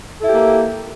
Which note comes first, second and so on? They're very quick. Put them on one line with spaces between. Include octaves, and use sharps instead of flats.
A4 E4 G4 A#3